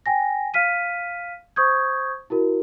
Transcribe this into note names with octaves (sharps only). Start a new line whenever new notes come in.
G5 G#5 A#6
F5 F6 B6 D#7
C5 C#6 D#6 G6 G#6
E4 F#4 A#4